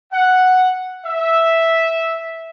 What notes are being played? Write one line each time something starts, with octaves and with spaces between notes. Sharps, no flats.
F#5
E5